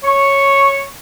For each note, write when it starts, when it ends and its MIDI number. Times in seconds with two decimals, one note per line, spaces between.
0.04 0.81 73
0.04 0.81 85